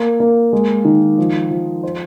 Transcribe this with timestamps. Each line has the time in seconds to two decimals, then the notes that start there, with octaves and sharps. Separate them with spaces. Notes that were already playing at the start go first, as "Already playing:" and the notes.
Already playing: A#3
0.20 A#3
0.53 G#3
0.85 D#3
1.18 F3
1.51 F3
1.83 C5